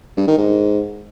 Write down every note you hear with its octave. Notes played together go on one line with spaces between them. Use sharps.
G2
D#3
G#2